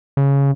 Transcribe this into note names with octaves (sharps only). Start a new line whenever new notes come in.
C#3